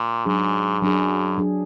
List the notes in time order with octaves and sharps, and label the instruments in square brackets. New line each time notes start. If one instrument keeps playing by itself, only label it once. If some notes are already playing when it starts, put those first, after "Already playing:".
Already playing: [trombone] A#2
[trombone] G#2 [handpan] F#3 D4 G#4
[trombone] F#2 [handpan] F#3 D4 G#4
[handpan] F#3 D4 G#4